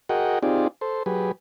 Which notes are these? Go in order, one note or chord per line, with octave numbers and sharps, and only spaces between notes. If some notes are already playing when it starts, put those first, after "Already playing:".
F#4 G#4 A#4 D#5 F#5 G5
C4 D#4 F4 G4 G#4 D5
A4 C5
F#3 G4 G#4 B4